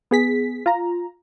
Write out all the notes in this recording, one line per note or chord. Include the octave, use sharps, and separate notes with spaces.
B3 G#4 B6
F4 A#5